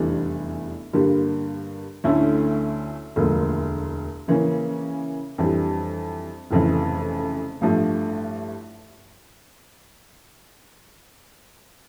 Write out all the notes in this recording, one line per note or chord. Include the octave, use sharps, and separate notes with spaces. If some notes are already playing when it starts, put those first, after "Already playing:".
Already playing: F1 E2 E3 G3 D4
G2 D3 G3 A#3
D2 D3 A3 C#4 E4
E1 D2 D3 F3 A#3
C#3 E3 A#3 C#4
F2 E3 G3 D4
F1 F2 C#3 E3
A1 G2 F3 A3